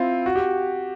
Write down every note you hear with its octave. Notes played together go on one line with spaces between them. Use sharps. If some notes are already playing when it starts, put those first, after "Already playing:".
Already playing: C4 E4 F4
F#4
G4